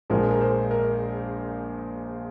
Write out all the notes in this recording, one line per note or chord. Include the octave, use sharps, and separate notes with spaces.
A#1 A#2 F3 G#3 A#4
A#4
C5
A#4